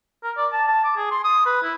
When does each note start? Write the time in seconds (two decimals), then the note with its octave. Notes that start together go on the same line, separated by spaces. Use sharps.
0.24 A#4
0.37 D5
0.53 A5
0.68 A5
0.84 D6
0.97 G#4
1.11 C6
1.24 D#6
1.46 B4
1.63 E4